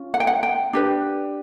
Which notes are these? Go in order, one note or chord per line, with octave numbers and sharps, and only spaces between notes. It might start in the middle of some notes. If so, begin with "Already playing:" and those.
Already playing: C#4 F4
F#5
G5
F#5
G5
D4 G4 B4